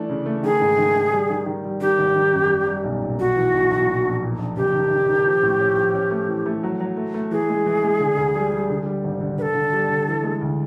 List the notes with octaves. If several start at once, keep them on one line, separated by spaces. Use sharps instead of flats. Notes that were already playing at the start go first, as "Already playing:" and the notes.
Already playing: E3 A3 D4
C#3
A3
D#3 G#4
G#2
D#3
D#3
G3
D#3
D#3
G3
D#3 G4
G#1
D#3
F#2
G3
G3
B1
A#2
B1 F#4
E3
B1
B1
A#2
A#1
A#2
A#1
F#1 G4
D#3
D#3
D#3
F3
A2
C#4
F3
C#4
A3
E3
A3
F#3
F#3
A3
A3
E3 G#4
G#3
E3
G#3
D3
D2
G3
G3
D3
G3
G#1
D3
D3 A4 B4
D3
G3
D3
E3
G#3
D2